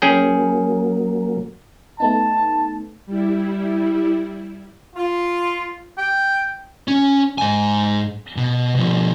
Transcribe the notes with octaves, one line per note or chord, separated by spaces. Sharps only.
F#3 A#3 C#4 G#4 G5
A3 B3 D#4 A5
G3 E4
F4
G5
C#4
G#2 G#5
B2
B2 F3